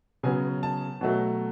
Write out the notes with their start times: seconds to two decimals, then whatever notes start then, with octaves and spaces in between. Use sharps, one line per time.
0.23 C#3 F#3 B3 G#5
0.63 A5
1.01 B2 F#3 A3